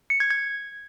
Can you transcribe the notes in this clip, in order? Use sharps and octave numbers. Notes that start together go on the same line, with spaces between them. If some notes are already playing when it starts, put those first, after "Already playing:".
C#7
G#6
G#6